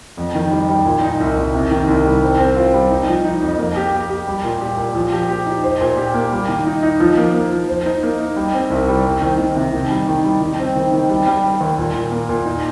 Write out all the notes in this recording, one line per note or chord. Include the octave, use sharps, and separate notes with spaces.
F2
D#3
G3
G3
A#2
D#4
C2
C2
C3
D#3
C2
G3
C4
C4
F4
G3
D#4
F3
D#4
F2
A#3
G4
G4
G4
G3
A#2
G4
A#2
F3
G4
G4
D#4
C5
A#2
G4
A#3
G3
D#3
D#4
D#4
F3
A#3
A#3
F3
C5
D#4
A#3
D#4
G3
C4
C2
G3
C4
D#3
D#3
C3
D#3
G3
D#3
G3
D#3
C4
D#3
D#3
G3
G3
G3
D#2
A#2
A#2
A#3
A#2
D#4